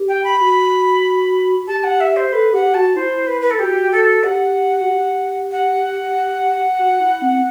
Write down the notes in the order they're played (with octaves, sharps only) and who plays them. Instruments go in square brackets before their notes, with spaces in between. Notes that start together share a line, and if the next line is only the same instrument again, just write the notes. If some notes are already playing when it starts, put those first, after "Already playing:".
Already playing: [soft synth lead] G4
[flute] G5
B5
[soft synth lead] F#4
[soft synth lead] G4 [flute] A5
[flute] F#5
E5
C5
[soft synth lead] A4 [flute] B4
[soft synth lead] G4 [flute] F#5
[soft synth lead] F#4 [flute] A5
[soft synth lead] E4 [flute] C5
[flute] B4
B4
A4
[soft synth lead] F#4 [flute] G4
[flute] A4
[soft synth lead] G4 [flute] F#5
[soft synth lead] F#4
G4
[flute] F#5
[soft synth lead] F#4
E4
C4